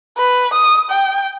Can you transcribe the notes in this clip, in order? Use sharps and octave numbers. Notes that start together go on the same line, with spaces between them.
B4
D#6
G5